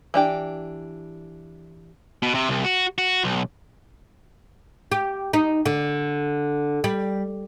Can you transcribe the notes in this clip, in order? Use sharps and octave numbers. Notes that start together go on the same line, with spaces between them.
E3 D4 G4
B2
C3
C2
F#4
F#4
B1
G4
D#4
D3
G3